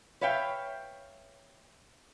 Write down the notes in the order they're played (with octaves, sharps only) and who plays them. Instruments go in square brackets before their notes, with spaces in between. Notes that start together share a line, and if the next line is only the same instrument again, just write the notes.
[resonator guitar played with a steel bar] B4 C#5 E5 F5 G5